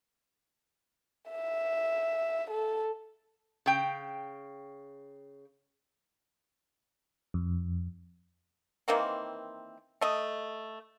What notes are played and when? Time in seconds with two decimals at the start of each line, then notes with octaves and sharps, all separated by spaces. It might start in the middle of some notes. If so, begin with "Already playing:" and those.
1.31 E5
2.51 A4
3.66 C#3 G5
7.34 F2
8.88 D#3 E3 A#3 C4
10.01 A3 D#5